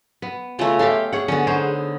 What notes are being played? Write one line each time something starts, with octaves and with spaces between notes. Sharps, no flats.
B3
C#3 A3 F4
G4 A4 E5 F5 C6
G#4 C#5 F#5
D3 B3 C#4
D#4 C5 C#5